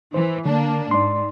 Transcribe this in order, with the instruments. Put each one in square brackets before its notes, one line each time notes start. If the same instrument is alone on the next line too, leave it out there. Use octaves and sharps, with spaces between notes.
[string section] E3 [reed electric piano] C5
[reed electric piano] D3 [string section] A#3 D4
[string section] G#2 [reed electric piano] D5 C6